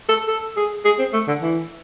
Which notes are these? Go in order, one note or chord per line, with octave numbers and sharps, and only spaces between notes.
A4
A4
G#4
G#4
C4
A3
D3
E3